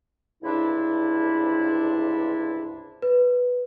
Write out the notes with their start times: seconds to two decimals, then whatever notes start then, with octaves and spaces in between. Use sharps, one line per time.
0.42 C#2 G2 C3 D4 E4
3.02 B4